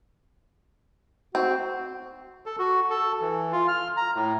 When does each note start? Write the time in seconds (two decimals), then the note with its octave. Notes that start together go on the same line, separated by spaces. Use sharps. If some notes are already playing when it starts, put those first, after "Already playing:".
1.35 C4 F#4
2.46 A4
2.59 F#4
2.90 A4
3.21 E3
3.52 F4
3.68 F6
3.97 A#5
4.15 A2